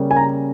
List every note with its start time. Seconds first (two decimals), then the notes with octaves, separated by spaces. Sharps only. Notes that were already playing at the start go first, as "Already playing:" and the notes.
Already playing: C#3 G3 A#3 C#4
0.11 G#5
0.16 A#5